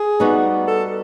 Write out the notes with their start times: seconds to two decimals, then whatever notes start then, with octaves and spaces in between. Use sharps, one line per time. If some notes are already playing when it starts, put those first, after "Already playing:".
Already playing: G#4
0.20 G3 B3 D#4 F#4
0.67 A4